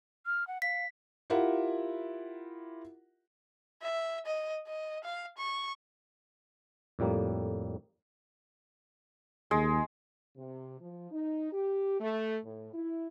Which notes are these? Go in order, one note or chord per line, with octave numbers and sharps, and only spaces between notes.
F6
F#5
F5 B6
E4 F4 G4 A#4 E5 F#5
E5
D#5
D#5
F5
C#6
F2 A2 G3 A#3
D#2 G#3
C3
F3
D#4
G4
A3
A2
E4